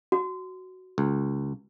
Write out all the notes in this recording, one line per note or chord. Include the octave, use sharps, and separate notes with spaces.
F#4
C#2